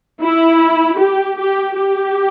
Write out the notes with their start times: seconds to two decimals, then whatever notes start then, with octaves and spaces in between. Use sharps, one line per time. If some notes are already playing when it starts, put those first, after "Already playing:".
0.20 E4
0.98 G4
1.37 G4
1.76 G4